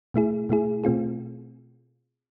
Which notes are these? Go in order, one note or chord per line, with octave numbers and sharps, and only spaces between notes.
B2 A3 E4 G#4
B2 A3 E4 G#4
B2 A3 C4 F4 G#4